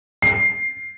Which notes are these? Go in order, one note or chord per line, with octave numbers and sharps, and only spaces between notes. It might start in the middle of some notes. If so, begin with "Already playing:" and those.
C7